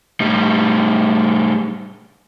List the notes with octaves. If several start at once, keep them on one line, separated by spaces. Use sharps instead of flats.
A2 G3